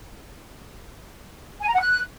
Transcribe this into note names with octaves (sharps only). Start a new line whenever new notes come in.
G#5
A#5
F#5
F#6